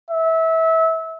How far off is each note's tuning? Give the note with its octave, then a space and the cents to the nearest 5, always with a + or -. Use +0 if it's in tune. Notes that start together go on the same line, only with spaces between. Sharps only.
E5 -25